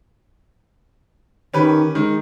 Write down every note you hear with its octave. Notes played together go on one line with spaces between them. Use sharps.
D#3 C#4 G4 B4
D#3 G#3